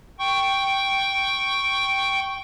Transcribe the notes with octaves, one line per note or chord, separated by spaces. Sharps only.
G5 C#6